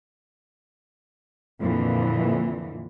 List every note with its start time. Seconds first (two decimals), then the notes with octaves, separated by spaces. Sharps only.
1.60 F2 A#2 D3 E3